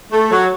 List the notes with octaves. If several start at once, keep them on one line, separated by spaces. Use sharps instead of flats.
A3
F#3